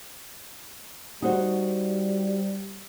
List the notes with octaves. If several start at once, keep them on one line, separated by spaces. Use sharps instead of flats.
G3 D#4 F#4 C5